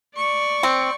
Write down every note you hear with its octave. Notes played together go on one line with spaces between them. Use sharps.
D5 C#6
C4